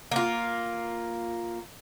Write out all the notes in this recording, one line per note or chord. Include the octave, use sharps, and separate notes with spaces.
A#3 F4